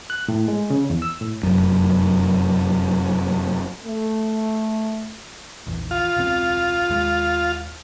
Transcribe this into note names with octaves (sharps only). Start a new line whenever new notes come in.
F#6
A2
G#3
C#3
E2
E6
A2
F1 F#2
A3
A#1 E2
F4
E1 C#2 C4
D#2 G#3